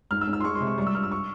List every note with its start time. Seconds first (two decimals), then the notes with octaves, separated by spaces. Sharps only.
0.11 G#2 F6
0.21 E6
0.28 G#2
0.33 E6
0.41 C6
0.44 G#3 C#6
0.55 C6
0.61 C3
0.67 C#6
0.78 G3 C#6
0.87 E6
0.95 G2 F6
1.04 E6
1.11 C#6